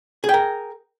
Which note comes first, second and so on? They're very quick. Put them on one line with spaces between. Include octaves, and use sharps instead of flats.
G#4 G5 A#4